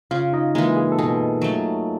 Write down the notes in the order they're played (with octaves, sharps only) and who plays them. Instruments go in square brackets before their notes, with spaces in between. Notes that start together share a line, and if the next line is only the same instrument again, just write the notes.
[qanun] C#3 [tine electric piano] F4 F5
[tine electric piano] D#4 D#5
[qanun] E3 G#3 [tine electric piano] A#3 A#4
[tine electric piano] G#4
A4
[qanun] B2 [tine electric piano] G#4
[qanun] F#3 A3